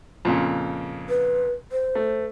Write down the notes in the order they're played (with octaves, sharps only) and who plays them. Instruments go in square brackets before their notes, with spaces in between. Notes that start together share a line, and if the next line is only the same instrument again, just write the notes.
[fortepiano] F2 A#2 C#3
[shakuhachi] B4
C5
[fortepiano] A3